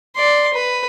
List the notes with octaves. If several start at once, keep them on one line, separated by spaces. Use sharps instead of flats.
D5 C6
B4